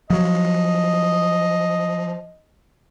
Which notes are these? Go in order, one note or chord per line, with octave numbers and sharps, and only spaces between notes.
F3 F#3 D#5